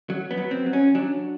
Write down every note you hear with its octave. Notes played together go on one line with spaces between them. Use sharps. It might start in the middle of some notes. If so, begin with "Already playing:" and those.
F#3
B3
F#3
C4
F#3
C#4
F#3 D4